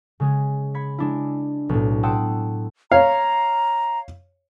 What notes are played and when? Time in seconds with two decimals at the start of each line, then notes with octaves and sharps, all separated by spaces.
0.20 C#3 G#3 G#4
0.74 B5 G#6 B6 C#7
0.98 G#3 D4 E4
1.69 B1 A2
2.03 F#5 G5 A5 C6 D#6 E6
2.92 C#5 F5 A#5